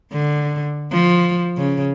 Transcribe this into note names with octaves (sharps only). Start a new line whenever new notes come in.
D3
F3
C#3